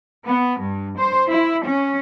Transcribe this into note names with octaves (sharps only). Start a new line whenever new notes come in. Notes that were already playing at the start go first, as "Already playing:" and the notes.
B3
G2
C5
E4
C#4